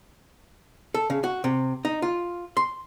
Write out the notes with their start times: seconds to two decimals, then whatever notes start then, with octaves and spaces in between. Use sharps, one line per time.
0.94 A4
1.10 C#3
1.24 F#4
1.44 C3
1.85 D#4
2.02 F4
2.57 C6